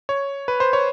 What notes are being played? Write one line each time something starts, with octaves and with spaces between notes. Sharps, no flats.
C#5
B4
C5
C#5